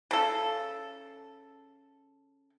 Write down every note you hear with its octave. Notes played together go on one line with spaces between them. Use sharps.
C#3 A4